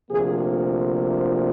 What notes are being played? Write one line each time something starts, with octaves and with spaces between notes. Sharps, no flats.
D2 C3 F3 A#3 G#4